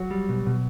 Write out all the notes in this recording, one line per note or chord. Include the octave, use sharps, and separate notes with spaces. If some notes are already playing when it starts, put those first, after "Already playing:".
Already playing: F#3 F#4
G3
B2
B2